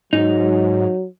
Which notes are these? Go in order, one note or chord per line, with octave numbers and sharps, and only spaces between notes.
G#2 F#3 D#4